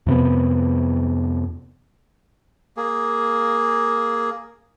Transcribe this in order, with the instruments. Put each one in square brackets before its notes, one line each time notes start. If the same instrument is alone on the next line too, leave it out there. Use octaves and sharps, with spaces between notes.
[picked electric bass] F2 C3 B3
[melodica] A#3 G#4